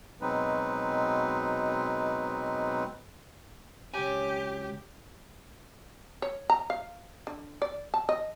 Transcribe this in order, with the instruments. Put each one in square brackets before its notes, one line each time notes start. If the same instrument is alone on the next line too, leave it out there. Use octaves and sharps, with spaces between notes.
[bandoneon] B2 F#3 G#3 C4 D#4 B4
[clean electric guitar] C#2 G#5 [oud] F#3 C4 C#4 [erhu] G4
[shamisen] C#5
A#5
F5
D3
D5
A5
D#5